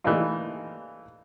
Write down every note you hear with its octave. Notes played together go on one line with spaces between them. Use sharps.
E3 G3 A3 A#3 D#4 F4